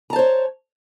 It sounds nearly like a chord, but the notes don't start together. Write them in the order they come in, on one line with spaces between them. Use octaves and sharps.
A#5 A5 C5 C#5